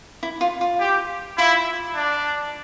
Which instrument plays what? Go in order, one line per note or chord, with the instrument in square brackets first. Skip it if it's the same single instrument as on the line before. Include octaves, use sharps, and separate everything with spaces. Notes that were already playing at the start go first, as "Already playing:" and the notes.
[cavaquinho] E4
F4
F4
[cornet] G4
[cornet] E4 [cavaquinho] F4
[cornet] D4